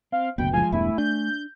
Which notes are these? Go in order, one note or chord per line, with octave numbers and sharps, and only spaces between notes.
C4 F5
F#1 D2 B2 B3 G5
F3 G#3 F4 G#5
E1 E2 G2 A3 E4 E5 G#5
D4 G6